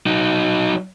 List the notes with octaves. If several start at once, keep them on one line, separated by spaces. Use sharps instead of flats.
F#3 D#4